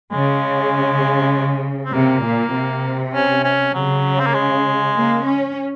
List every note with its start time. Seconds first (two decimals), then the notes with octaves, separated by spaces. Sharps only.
0.11 C#3 G#3
1.85 C4
1.93 C3 A#3
2.23 A#2
2.53 C3
3.14 C#4
3.44 C#4
3.74 C#3 F#3
4.20 C4
4.27 A#3
4.34 G#3
4.95 A#3
5.24 C#4